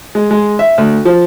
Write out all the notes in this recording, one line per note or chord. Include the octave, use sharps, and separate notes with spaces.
G#3
G#3
E5
D2
F3